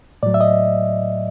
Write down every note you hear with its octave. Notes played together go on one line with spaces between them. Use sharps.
A2 F#3 D5
E5
D#5